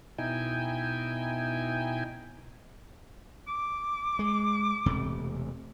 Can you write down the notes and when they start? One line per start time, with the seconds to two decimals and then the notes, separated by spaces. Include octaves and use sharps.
0.18 B2 D#4 E4 G5 G#5
3.48 D6
4.19 G#3
4.86 E1 C3 A3